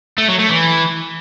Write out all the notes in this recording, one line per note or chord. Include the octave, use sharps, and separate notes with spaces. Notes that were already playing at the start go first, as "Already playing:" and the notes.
A3
F#3
A3
E3